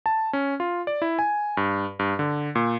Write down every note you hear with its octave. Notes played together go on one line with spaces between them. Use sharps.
A5
C#4
F4
D5
E4
G#5
G2
G2
D3
A#2